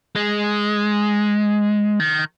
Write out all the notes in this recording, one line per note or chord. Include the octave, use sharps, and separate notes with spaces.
G#3
D#3